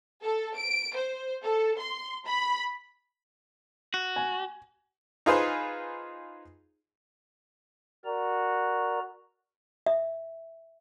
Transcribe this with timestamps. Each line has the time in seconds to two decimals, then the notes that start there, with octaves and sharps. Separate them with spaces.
0.23 A4
0.56 D7
0.95 C5
1.43 A4
1.77 C6
2.26 B5
3.94 F#4
4.16 G#5
5.26 D#4 F4 G#4 B4 C5
8.05 F#4 A#4 D5 A#5
9.86 E5